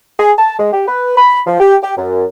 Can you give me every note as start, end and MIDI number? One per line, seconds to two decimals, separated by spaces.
0.19 0.32 68
0.38 0.59 81
0.59 0.69 56
0.73 0.86 67
0.88 1.13 71
1.17 1.40 83
1.47 1.60 53
1.60 1.76 67
1.83 1.94 67
1.97 2.25 42